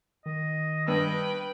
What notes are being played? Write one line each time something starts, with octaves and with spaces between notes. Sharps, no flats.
D#3 D#5
G2 B4 G5 E6